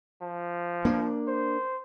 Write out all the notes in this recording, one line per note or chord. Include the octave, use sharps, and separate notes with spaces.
F3
A#3 D4
C5